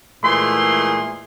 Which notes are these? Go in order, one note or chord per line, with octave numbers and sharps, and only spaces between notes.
A#2 E3 G#3 A3 G#4 C6